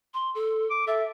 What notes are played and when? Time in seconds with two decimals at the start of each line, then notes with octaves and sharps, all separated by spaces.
0.14 C6
0.35 A4
0.70 D6
0.87 A4 E5